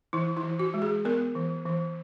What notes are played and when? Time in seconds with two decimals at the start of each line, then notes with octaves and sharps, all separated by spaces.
0.13 E3 E4
0.37 E4
0.43 E3
0.59 F#4
0.74 G#3
0.82 G#4
1.05 B3 A#4
1.35 E3
1.66 E3